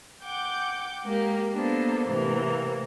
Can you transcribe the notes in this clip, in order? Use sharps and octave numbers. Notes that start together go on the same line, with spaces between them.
F#5 G5 D6 G6
G#3 A#3 G4
A#3 B3 D4 A4 C5
A2 C3 E3 A#3